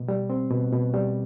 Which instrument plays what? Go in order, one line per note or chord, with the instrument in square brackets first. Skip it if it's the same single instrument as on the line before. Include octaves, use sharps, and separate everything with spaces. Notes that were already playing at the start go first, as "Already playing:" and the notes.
Already playing: [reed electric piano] B2
G3
C4
B2
B2
G3